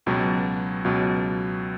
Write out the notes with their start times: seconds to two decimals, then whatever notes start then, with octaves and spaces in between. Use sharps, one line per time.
0.06 C#2 B2 F#3
0.84 C#2 B2 F#3